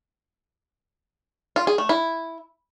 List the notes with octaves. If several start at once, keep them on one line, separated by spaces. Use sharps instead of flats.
F4
G#4
A3
E4